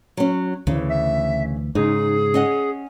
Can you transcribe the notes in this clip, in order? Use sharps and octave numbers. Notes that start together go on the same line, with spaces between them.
F#3 C#4
D2 C#3 E3
E5
G#2 C#3 D#4 G#4
C#4 D#5 F#5